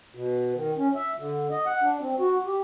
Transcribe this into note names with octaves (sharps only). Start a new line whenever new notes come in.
B2
D#3
C#4
E5
D3
D#5
F#5
D4
C4
F#4
G4